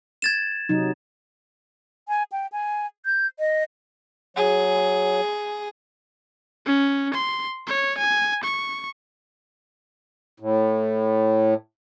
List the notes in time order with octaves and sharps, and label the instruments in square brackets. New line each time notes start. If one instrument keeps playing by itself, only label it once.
[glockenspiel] G#6 A6 E7
[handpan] C3 F#3 D#4
[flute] G#5
G5
G#5
G6
D#5
[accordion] F#3 [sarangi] G#4
[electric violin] C#4
C6
C#5
G#5
C#6
[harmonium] A2